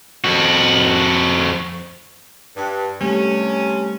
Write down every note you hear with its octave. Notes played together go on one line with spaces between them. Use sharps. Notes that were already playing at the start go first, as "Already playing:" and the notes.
F2 F#4
G2
G2 C3 G3 A3 C#4